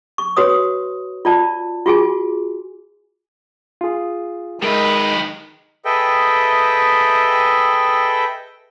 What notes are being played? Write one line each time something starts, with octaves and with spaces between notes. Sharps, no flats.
C#6
F#4 B4 C#5 D#6
F4 D5 A5
F4 F#4 G#4 G#5
F4 G#4
D#3 G#3 A#4 B4 D#5 E5
G#4 A4 B4 D#5 E5 G5